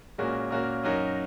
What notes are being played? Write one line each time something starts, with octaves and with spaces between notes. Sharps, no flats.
A#2 G#3 C#4 F#4 A#4
A#2 A#3 C#4 F#4 A#4
F#2 F#3 D#4 F#4 A#4